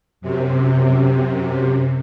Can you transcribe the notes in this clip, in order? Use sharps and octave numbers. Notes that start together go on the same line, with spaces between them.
F#2 C3